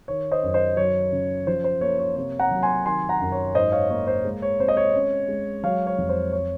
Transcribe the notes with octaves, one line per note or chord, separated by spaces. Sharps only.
D#3 C#5
C5 D#5
F#2
C5 D#5
F#3 C#5
C#3
F3 C5
C5
A#3 C#5
C#5
C3 C#5
F#5 A#5
F#3
G#5 C6
D#3 G#5 C6
F#5 A#5
F#2
C#5
G#2 C5 D#5
C#5 F5
A#3 C#5
C5
G#3
C#5
C4 C5
D#5
C#5
C#4
G#3
F#3 C#5 F5
C#5
F2
C5
C#5